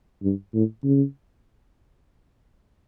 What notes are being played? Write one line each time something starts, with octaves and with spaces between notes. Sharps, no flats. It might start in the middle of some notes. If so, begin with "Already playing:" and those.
G2
A2
C#3